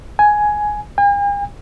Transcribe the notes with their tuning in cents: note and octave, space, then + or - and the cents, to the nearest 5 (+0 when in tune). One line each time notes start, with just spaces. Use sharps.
G#5 +10
G#5 -45